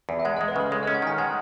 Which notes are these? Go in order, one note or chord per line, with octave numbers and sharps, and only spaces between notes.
E2
E5
G#3 F#5
G#3 D#5
B4
C#3 A4
G#3 C#5
C#4 D#5
F#5
D#3 G#5
G#3 F#5